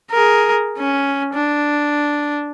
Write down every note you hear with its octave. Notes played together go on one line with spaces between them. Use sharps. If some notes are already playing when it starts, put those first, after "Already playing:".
G#4 A#4
C#4
D4